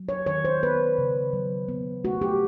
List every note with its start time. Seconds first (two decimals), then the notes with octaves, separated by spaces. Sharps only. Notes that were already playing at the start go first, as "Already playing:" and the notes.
Already playing: F#3
0.09 C#5
0.26 D#3 C#5
0.45 C5
0.63 B3 B4
0.98 C#3
1.33 F#3
1.68 B3
2.05 A3 F#4
2.22 G4